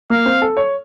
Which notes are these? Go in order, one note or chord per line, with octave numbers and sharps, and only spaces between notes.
A#3 F5
C4
A4
C#5